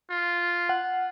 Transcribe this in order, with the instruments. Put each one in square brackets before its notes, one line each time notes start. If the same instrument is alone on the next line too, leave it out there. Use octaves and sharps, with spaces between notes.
[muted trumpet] F4
[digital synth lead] F#5